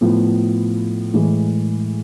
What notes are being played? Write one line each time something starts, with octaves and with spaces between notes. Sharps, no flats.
A2 F3 B3
A2 E3 G#3